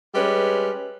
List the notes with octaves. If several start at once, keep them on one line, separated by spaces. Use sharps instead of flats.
G3 G#3 C#4 B4